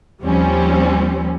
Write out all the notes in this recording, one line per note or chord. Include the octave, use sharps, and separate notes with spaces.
D#2 F3 G3 C4 C#4